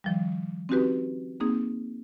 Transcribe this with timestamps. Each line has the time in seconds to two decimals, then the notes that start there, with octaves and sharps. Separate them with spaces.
0.04 D#3 F3 G3
0.69 C4 C#4 D#4 F#4 G4 B4
1.40 A#3 C4 D#4 G#4